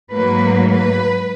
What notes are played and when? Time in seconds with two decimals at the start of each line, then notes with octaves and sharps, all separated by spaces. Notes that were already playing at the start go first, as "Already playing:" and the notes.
0.13 G#2 F#3 A#3 B4
0.68 B4